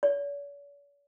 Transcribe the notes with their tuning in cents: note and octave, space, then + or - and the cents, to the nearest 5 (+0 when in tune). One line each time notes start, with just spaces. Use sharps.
C#5 +45